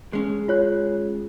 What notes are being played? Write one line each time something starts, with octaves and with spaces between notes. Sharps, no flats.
G#3 C#4
F4 C#5 F#6